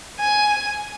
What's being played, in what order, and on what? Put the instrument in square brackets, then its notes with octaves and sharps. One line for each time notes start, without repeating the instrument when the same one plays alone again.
[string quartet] G#5